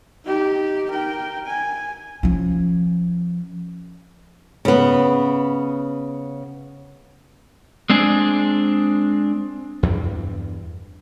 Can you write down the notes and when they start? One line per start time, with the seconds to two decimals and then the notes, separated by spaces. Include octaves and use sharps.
0.25 D#4 G4
0.91 A#4 G5
1.46 G#5
2.23 F3 C#4
4.65 C#3 B3
7.90 G#3 C4 D4 G#4
9.83 E2 G2 G3